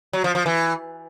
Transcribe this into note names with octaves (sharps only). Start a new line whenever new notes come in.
F#3
F3
F3
E3